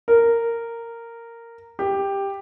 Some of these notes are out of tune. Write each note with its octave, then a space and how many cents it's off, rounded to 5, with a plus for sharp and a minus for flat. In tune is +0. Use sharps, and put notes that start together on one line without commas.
A#4 -10
G4 +10